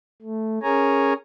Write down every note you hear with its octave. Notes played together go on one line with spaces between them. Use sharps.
A3
C#4 G#4 A#4 C#5 G#5 A#5